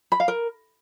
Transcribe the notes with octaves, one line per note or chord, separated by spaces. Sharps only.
B5
F5
A#4